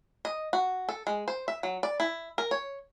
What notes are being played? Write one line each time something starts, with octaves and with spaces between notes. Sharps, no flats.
D#5
F#4
A4
G#3
C5
E5
F#3
D5
E4
A#4
C#5